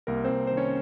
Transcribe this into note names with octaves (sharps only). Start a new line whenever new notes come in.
C2 A#3 A#4
C4 C5
C2
D#3 C5
C#4 C#5